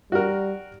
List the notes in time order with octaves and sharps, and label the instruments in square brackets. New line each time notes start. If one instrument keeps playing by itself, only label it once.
[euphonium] G3 [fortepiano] F#4 A#4